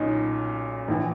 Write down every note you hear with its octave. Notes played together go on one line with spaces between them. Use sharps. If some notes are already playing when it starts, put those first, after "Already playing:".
Already playing: B1 A#2 C#4 D#4
A#1 E3